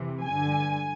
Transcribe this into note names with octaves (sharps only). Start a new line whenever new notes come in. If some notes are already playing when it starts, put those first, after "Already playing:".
Already playing: F2 C3 E3
G2 D3 G#5